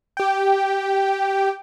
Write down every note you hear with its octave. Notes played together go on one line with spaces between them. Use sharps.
G4 G5